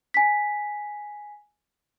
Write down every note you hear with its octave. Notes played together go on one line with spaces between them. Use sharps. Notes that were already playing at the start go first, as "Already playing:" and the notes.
G#5 B6